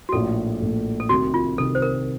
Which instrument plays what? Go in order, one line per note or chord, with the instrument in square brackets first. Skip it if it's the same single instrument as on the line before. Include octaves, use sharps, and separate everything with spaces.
[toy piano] F#4
[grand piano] A#1 A2 A3 [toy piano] A4
[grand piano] A#1 A2 A3
[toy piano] A4
[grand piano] C2 C3 D#3 [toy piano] F#4
[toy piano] F4
[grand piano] C2 C3 D#3 [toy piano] A4
[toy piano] C5
A#4